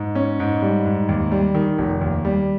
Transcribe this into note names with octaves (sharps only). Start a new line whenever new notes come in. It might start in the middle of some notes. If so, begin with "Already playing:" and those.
Already playing: G#2
C#4
G#2
G3
G#2
D#2
G3
D#3
F1
D#2
G3